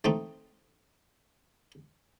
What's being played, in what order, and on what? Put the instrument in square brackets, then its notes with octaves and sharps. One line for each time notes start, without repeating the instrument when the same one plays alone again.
[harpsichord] A3 C4 D#4